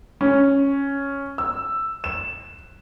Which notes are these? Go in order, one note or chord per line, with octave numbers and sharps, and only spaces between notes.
C#4
E6
E7